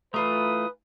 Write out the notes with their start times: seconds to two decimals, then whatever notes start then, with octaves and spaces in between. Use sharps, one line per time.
0.14 E3 A3 F4 B4 A#5 D#6